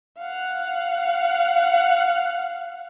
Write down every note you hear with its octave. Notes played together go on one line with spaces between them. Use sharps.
F5 F#5